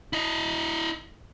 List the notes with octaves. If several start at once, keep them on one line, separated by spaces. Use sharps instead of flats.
E4 D#5